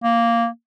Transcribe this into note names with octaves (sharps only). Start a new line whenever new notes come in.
A#3